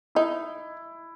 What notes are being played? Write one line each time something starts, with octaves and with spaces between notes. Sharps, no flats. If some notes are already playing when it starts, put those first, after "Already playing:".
D#4 E4